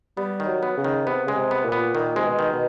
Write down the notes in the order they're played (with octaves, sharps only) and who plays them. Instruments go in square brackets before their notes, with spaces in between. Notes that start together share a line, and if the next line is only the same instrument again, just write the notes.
[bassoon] G3 [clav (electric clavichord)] B3
[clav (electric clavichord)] D#3
[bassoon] F#3
[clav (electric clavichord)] B3
[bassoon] C#3
[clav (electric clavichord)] D#3
[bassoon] C3 [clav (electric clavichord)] B3
[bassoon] C#3 [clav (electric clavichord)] G#3
[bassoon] C3
[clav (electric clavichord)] B3
[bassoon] A#2
[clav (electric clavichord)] B3
[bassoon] A#2 [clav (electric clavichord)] D#3
[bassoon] C3 [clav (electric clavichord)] G#3
[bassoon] B2
[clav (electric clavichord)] D#3
[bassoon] B2